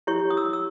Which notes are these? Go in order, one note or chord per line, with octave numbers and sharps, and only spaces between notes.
E4 G4 C#5 C#6
D#6
E6
D#6
E6